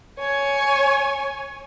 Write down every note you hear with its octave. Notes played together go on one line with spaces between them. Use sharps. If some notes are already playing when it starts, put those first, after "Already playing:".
C#5 G#5